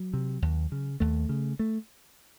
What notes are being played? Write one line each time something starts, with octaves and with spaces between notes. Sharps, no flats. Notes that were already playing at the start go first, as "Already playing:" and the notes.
Already playing: F#3
C3
D#2
C#3
D#2 A3
C#3
A3